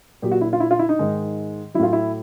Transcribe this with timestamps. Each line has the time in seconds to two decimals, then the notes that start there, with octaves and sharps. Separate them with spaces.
0.22 A#2 F#3 G4
0.32 F#4
0.41 E4
0.53 F4
0.60 E4
0.71 F4
0.79 E4
0.89 D#4
0.99 G#2 D#3 G#3
1.74 F#3 E4
1.79 A2 F4
1.93 E4